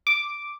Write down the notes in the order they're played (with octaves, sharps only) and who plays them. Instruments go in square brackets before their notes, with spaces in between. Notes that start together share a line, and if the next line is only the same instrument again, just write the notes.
[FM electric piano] D6